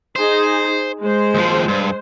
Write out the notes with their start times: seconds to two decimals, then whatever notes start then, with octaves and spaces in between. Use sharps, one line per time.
0.16 D#4 G#4 C5
1.01 G#3 C5
1.35 D#2 F3
1.68 G2